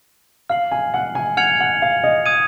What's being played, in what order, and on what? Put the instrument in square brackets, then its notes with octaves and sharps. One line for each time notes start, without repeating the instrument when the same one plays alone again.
[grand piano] F5 [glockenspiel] F6 C7 F#7
[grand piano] G#5
F#5
G#5
[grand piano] F#5 [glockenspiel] F6 G#6 C#7 F7
[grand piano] F#5
F5
D#5
[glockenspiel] D#6 G#6 D#7